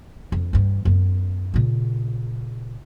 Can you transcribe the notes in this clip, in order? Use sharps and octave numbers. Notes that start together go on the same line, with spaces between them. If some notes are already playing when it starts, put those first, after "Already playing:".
F2
G2 E3
F#2 B3
A#2 C#3